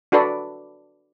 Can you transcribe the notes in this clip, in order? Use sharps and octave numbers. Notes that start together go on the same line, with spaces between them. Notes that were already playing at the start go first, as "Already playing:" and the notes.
D4 F#4 A4 B4 D5